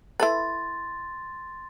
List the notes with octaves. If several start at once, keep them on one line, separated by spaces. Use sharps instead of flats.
E4 A4 B4 C6 A6